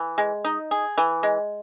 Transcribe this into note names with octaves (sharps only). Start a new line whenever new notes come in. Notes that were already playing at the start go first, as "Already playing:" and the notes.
Already playing: E3
G#3
D#4
G#4
E3
G#3